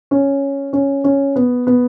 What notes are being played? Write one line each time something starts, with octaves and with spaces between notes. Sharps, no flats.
C#4
C#4
C#4
B3
B3